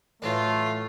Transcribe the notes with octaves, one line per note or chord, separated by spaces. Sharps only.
A2 E3 F#3 A3 F4